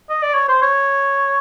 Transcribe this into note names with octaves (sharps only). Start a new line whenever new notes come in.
D#5
D5
C#5
C5
C#5